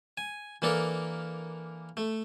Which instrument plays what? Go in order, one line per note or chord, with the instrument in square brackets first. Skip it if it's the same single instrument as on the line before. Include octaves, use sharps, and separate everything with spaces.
[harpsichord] G#5
E3 A#3 D4 A4 A#4
A3